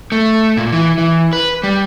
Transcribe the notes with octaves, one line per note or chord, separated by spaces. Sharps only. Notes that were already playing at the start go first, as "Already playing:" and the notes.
A3
A#2
E3
E3
B4
G3